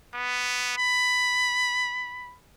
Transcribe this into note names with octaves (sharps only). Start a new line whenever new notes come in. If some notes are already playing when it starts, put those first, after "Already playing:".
B3
B5